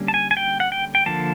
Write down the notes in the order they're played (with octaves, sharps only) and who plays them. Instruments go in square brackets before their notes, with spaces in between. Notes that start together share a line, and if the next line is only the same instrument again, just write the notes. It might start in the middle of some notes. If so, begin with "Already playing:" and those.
Already playing: [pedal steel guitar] D3 G3 A#3 C#4
A5
G#5
G#5
G5
F#5
G5
G5
D3 F3 A#3 A5